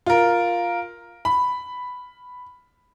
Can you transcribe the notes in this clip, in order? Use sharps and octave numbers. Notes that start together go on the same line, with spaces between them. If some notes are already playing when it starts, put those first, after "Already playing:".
F4 A#4
B5